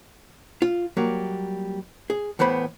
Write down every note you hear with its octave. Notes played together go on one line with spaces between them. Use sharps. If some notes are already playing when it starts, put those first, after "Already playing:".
F4
F#3 G3 A#3
G#4
A2 E3 B3 C5 B5